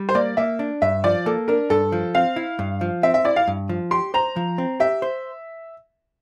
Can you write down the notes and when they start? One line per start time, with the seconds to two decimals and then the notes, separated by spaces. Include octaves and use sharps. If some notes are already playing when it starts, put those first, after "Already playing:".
Already playing: G3
0.09 C5
0.15 A#3 D5
0.37 A#3 E5
0.59 D4
0.82 G2 E5
1.04 F3 D5
1.26 A#3 A4
1.48 D4 A#4
1.70 G2 A4
1.92 F3
2.15 C4 F5
2.36 E4
2.59 G2
2.81 F3
3.03 C4 E5
3.14 E5
3.25 E4 D5
3.36 F5
3.48 G2
3.69 F3
3.91 G4 C6
4.14 C5 A#5
4.36 F3
4.58 C4
4.80 G4 E5
5.02 C5